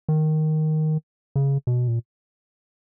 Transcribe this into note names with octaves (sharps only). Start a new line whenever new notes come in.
D#3
C#3
B2
A#2